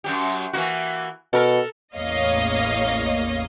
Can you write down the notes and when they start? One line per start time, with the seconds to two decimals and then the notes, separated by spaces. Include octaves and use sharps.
0.04 F#2 F#3 G4
0.53 E3 A#3 F#4
1.33 B2 A4 A#4
1.96 A1 E2 A#3 C#5 D#5 F5